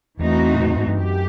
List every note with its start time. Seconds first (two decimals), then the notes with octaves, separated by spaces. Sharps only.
0.19 E2 E3 A3 C4 D#4 F#4
0.54 A#2
0.65 A2
0.75 G#2
0.87 G2
0.97 F#2 G4